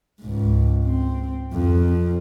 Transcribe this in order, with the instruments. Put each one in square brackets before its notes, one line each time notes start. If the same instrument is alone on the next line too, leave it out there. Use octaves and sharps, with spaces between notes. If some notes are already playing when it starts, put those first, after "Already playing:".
[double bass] C#2 G#2
C4
F2